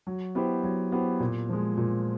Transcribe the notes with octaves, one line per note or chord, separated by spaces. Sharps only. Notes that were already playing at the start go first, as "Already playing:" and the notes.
F#3
B3 E4 G4 C5
F#3
B3 E4 G4 C5
A#2
F3 G#3
A#2